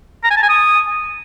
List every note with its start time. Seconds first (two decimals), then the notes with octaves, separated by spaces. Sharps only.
0.24 A#5
0.30 G#5
0.36 A5
0.43 G#5
0.49 D#6